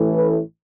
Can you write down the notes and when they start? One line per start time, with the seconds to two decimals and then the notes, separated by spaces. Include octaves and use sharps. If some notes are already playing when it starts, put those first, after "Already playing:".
Already playing: A1 A2 E3 A3
0.17 B4